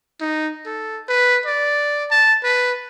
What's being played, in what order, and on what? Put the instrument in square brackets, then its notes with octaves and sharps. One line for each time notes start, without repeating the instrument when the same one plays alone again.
[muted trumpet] D#4
A4
B4
D5
A5
B4